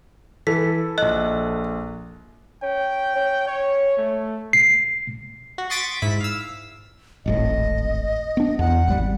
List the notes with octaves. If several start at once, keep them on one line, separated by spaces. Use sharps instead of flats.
E3 A4 B6
A#1 D#5 F#6
C#4 G5
C#4
C#5
A3
C7
F#4
C6 C#6 D#6 A6 B6 D7
G#2 E4 B6
F5 E6
D1 G#1 A2 D#5
B3 D4
E2 F#5
G#1 G3